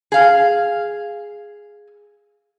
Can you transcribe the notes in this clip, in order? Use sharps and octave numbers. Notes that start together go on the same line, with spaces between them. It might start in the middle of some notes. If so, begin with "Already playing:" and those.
G#4 F5